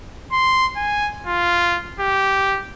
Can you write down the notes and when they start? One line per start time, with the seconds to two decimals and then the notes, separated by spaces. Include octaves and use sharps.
0.32 C6
0.76 G#5
1.27 F4
2.00 G4